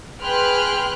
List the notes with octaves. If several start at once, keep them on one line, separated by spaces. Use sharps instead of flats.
G#4 B4 G5 C6 F6 F#6